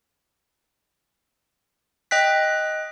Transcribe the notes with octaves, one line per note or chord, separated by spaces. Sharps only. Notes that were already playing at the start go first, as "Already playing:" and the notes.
D#5 G5 F#6 B6